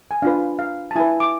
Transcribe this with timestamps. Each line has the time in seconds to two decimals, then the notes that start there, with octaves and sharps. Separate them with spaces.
0.11 G#5
0.22 D4 F4 B4 F5
0.59 F5
0.91 A5
0.96 E4 G#5
1.00 B4
1.20 D6